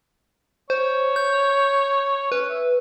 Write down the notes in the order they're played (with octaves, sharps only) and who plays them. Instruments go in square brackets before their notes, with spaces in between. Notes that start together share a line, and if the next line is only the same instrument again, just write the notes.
[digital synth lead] C5 [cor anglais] C#5
[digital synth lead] G6
[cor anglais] C#4 [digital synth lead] B4
[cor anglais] E5